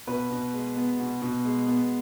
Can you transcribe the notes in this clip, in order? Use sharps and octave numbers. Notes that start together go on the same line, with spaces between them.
B2 B4
B2
G#3
B3
B2
B2
G#3
B3